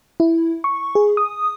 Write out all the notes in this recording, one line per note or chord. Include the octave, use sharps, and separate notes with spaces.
E4
C#6
G#4
D#6